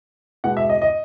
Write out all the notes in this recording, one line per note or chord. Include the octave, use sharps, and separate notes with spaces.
B2 G#3 B3 F#5
E5
D#5
D#5